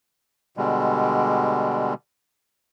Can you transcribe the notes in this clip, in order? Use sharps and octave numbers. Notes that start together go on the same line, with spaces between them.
B2 D3 G3 G#3